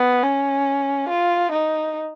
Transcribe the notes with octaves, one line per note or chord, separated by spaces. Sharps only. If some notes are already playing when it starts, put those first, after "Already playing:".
Already playing: B3
C#4
F4
D#4